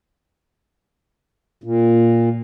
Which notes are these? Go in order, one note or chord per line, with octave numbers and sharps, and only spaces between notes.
A#2